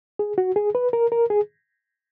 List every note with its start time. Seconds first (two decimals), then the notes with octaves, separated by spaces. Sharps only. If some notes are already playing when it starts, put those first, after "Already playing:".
0.19 G#4
0.38 F#4
0.56 G#4
0.75 B4
0.93 A#4
1.12 A#4
1.30 G#4